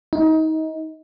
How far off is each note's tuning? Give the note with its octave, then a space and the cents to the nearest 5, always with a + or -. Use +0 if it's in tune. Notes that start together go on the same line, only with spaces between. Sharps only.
D#4 +25